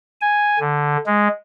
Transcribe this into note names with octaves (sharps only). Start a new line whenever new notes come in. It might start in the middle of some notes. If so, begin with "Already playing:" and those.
G#5
D3
G#3